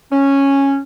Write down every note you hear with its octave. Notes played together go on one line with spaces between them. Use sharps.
C#4